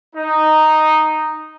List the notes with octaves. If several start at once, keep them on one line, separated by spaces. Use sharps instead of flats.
D#4